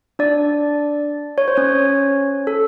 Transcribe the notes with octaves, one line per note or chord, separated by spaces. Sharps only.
D4 D5
C#5
C5
C#4 C#5
A4